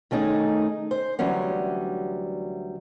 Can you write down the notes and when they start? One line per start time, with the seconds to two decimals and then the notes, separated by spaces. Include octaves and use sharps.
0.11 D#3 A3 C#4 D#4 G#4
0.91 C5
1.19 D2 E3 F#3 G3 C#4 F#5